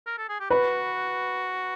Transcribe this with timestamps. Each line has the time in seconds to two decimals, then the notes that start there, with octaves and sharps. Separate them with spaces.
0.07 A#4
0.18 A4
0.29 G#4
0.40 G4
0.50 F#4 B4